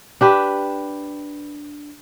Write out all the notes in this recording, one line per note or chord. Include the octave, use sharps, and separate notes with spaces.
D4 G4 B4